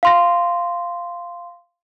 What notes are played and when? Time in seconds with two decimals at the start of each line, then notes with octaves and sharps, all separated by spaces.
0.03 F5 C6 A#6